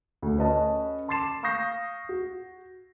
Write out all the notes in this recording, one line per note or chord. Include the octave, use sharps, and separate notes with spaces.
D2
C#4 A4 B4 C#5 D#5 A5
A5 C6 D6 A6 C7 E7
F5 C#6 D#6 G6 A#6 C7
F#4